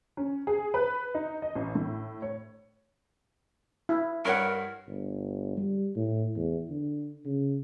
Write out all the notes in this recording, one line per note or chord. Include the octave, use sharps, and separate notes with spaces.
C#4
G#4
B4
D#4
D#5
A1
A2
C#5
E4
G2 A#4 C#5 F#5
G1
G3
A2
E2
D3
C#3